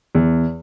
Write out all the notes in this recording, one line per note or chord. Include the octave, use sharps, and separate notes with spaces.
E2